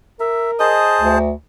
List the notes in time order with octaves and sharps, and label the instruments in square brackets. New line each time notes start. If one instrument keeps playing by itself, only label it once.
[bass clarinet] A#4 [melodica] E5
[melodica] G#4 C5 A5 [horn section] D#5
[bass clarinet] D2